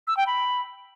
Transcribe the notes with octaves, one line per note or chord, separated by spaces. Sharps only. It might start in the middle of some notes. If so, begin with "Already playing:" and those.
E6
G5
B5